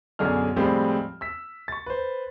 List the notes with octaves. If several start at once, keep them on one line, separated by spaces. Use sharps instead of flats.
B1 F#2 D3 D4 G#4 F6
A2 F3 G3 G#3 C4 F4
E6 B6
C#6 A6
B4 C5